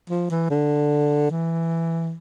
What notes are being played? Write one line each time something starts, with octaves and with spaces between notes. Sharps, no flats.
F3
E3
D3
E3